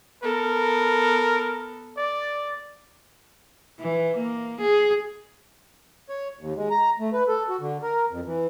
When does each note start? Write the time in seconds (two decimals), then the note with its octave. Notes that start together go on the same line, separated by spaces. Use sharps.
0.23 B3 A4 A#4
1.97 D5
3.80 E3
4.17 A#3
4.61 G#4
6.09 C#5
6.40 D#2
6.56 G#3
6.70 A#5
7.00 A3
7.13 B4
7.28 A4
7.49 F#4
7.60 D3
7.83 A#4
8.11 F2
8.26 E3